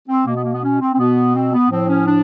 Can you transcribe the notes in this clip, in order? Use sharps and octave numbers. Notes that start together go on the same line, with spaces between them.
C4
B2 A#3
B3
A#3
B3
C#4
C4
C4
B2 B3
C4
B3
A2 F3 C4
C#4
D4